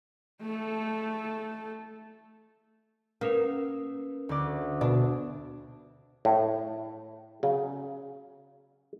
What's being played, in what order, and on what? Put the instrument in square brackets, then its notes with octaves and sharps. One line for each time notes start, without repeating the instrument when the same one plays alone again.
[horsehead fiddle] A3 A4
[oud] A#3 [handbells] C#4 A#4 B4
[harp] D2 D5
[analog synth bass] B2 [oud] D4
[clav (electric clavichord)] A2
C#3 F#3